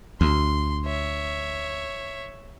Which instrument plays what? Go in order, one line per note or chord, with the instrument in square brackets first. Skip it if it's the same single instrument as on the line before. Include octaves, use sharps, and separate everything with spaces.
[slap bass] D2 [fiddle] C6
[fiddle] C#5 E5